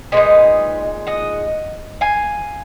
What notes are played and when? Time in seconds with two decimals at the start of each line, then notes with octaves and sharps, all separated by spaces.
0.12 A#2 G#3 D#4 B4 D#5
1.07 D#5 F#5
2.01 F5 G#5